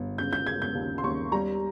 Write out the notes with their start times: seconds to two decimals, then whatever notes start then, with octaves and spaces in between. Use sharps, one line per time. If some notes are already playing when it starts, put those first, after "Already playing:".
Already playing: G1
0.18 C#3 G6
0.33 G6
0.46 C#3 G#6
0.62 G6
0.75 D#2
0.98 C6
1.04 D#2 C#6
1.32 G3 A#5